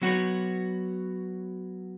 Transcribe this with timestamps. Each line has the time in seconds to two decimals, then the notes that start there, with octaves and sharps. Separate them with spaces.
0.02 F#3 B3 F#4 C#5